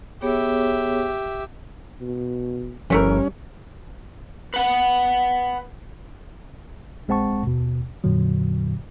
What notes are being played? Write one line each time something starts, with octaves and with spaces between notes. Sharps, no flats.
B3 G4 G#4 C#5 E5
B2
G1 E3 F3 G3 A3 C#4 A#4
B4 F#5
A#1 G#3 C4 F#5 A5 C#6
D#2 B2
F2 A#2 D3 F#3